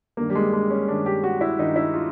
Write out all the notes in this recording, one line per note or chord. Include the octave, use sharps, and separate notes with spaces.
G2 D#3 A#3
G3
G#3
G#3
C#4
G2 D#3 D4
G4
F#4
E4
G2 D#3 D#4
E4
F4